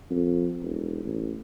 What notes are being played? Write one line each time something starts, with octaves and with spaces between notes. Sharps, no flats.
F2
E1
A1